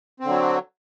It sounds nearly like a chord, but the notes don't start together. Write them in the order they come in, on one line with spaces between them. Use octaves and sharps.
C4 D3 F#3